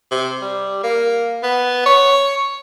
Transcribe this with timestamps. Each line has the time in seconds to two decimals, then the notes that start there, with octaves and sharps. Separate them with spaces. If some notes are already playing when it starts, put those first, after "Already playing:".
0.11 C3
0.41 G3
0.83 A#3
1.43 B3
1.86 C#5